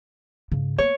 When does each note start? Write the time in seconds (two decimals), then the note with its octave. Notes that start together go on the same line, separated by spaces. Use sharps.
0.52 G#2 C#3
0.78 A#3 B3 C#5